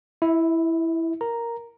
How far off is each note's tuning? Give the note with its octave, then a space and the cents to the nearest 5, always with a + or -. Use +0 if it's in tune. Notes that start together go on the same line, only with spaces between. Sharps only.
E4 +0 E5 -35
A#4 +0 A#5 +0